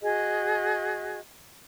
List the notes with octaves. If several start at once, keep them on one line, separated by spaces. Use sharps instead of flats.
F#4 G#4 D#5